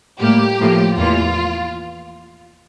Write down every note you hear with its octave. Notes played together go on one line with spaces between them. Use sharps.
A2 G3 A#3 G4
A2 F3 A#3
E2 E3 A#3 F4